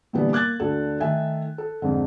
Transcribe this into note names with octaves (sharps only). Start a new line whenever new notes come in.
A#2 D3 E3 G3 B3
A#3 D6 F#6 G#6 A6
D2 D3 F#4 A4
D#3 A3 E5 G#5
A4
F2 G#2 D3